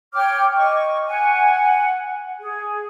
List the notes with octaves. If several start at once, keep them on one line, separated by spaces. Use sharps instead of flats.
C#5 G5 D6 F6
D#5 C#6
F#5 G#5
G#4